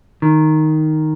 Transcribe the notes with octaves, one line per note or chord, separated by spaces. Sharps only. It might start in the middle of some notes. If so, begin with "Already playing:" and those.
D#3